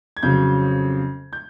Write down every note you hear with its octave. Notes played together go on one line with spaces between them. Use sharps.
G#6
F2 C#3 F#3 G6
G6